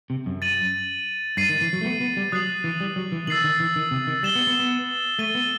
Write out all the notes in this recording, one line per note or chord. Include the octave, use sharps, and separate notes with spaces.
C3
F#2
A6 D#7 F#7
G2 A6 C7 D#7
D#3
E3
F#3
A3
B3
B3
G3
F#3 D#6 F#6 C7 F#7
E3
G3
F#3
E3
D#3 E6 A6 C7 F#7
D#3
E3
D#3
C3
D#3
G3 A6 E7 G7
B3
B3
B3
A3 A6 D#7 G7
B3